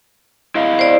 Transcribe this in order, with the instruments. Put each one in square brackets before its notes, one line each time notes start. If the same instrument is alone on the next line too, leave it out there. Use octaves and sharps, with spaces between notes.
[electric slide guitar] E4 D#5 F5
[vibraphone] C5 D5